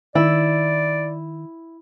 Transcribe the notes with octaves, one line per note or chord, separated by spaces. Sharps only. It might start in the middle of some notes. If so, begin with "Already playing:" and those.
D#3 E4 D5